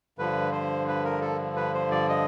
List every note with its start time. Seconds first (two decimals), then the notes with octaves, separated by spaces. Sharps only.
0.18 G2 D3 F3 B4
0.52 C5
0.88 B4
1.04 A#4
1.21 A4
1.56 B4
1.74 C5
1.91 D5
2.09 D#5